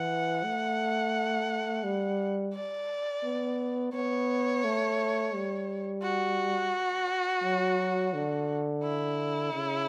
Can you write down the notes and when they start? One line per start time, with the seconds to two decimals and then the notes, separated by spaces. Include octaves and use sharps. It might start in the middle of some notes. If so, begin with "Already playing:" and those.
Already playing: E3 F#5
0.44 A3
1.84 G3
2.54 D5
3.24 B3
3.94 B3 C#5
4.64 A3
5.34 G3
6.03 F#4
7.43 F#3
8.14 D3
8.83 E4
9.53 C#3